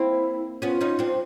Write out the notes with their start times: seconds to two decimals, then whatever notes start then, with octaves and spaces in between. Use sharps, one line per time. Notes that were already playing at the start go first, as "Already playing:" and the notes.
Already playing: A#3 C4 E4
0.62 B3 C#4 F4
0.81 C#4 D#4
0.99 C4 D4